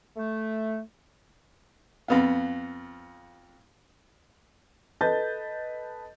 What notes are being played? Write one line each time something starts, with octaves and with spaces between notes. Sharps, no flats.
A3
F2 B3 F4
A4 B4 D#5 A5 G6 A6